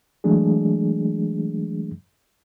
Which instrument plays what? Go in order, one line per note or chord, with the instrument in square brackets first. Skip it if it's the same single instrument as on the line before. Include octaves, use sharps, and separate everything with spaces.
[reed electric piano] E3 F#3 G#3 A3 D4 G#4